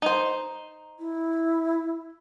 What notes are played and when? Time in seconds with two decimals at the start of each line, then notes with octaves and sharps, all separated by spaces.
0.02 D#4 C5
0.99 E4